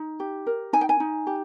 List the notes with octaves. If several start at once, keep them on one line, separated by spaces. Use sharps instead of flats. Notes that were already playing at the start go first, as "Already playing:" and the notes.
Already playing: D#4
G4
A#4
D#4 G#5
G5
G#5
D#4
G4